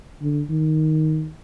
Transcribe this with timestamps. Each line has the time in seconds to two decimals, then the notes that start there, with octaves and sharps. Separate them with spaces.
0.22 D3
0.50 D#3